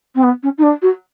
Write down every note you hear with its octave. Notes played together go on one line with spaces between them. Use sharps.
C4
B3
C#4
D#4
D4
F#4